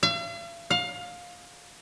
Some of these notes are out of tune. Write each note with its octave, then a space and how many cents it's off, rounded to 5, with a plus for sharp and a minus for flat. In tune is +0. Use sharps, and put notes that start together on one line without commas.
F5 -45
F5 +20